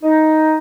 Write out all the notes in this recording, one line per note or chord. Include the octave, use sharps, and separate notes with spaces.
D#4